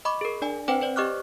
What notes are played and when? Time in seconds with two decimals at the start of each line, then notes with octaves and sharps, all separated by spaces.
0.05 D#5 B5 C#6 D6
0.21 G#4 A#4
0.42 D4 D5 G#5
0.68 C4 B4 C5 F#5 G5
0.81 B4 C5 D5
0.96 G4 D#5 C#6 D6 F6 F#6